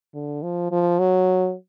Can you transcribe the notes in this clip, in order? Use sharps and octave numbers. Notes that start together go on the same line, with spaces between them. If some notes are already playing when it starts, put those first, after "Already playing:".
D3
F3
F3
F#3